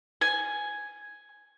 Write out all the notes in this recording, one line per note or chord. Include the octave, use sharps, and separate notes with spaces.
G#5